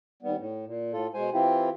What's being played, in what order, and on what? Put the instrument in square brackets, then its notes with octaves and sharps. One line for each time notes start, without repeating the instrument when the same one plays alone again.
[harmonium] D#2 G3 B3
A2
A#2
A2 F4 A4
B2 G#3 C5 G#5
E3 C4 E4 F4 G4